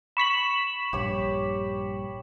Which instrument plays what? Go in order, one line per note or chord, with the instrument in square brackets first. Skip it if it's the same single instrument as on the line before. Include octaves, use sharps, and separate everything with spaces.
[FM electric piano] B5 C#6 B6 [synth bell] E7 F#7
[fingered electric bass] A#1 G2 [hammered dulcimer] G4 C#5